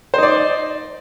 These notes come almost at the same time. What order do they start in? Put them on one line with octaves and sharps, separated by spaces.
C5 D#4 D5